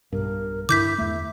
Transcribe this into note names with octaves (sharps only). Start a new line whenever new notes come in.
B1 G2 A#4
G2 D3 E4 D6 G6 B6
E2 A3 E5